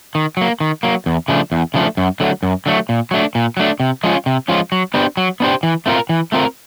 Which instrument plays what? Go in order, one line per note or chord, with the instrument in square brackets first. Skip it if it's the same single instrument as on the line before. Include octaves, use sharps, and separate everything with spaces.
[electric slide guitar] D#3
F#3 A#3
D#3
F#3 A#3
E2
C#3 F3 A3 D4
E2
C#3 F3 A3 D4
F#2
D3 F#3 A3
F#2
D3 F#3 A3
A#2
F#3 A3 D4
A#2
F#3 A3 D4
C3
F3 G#3 C#4 F4
C3
F3 G#3 C#4 F4
F#3
B3 D4 G4 C5
F#3
B3 D4 G4 C5
E3
A3 C4 F4 A#4
E3
A3 C4 F4 A#4